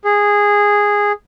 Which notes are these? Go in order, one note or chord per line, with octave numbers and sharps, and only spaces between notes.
G#4